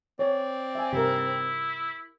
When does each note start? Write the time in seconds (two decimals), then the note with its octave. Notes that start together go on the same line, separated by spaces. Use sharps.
0.19 C4 C#5 D5
0.75 E5 G#5
0.93 G2 C3 E4 G4 A#4